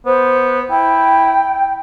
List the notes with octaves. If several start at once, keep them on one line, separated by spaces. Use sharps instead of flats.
B3 C5
E4 G5